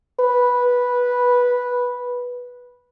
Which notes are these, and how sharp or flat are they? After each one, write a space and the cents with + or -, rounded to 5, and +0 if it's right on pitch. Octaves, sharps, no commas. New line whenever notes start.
B4 -10